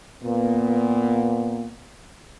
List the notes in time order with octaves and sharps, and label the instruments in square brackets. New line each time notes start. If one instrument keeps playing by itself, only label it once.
[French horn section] A#2 B3